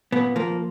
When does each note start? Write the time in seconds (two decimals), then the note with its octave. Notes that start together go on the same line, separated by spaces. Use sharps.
0.12 A#2 B3
0.36 F3 A#3